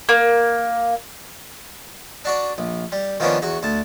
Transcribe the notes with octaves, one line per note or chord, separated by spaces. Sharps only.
A#3
D4 F#4 D5
A#1
G3
D#3 F3 A#3 B3 C#4 D4
E2 F#4
D2 A5